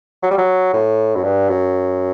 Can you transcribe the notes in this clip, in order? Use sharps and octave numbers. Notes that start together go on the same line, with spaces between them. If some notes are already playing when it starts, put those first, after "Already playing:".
F#3
G3
F#3
A2
F#2
G2
F#2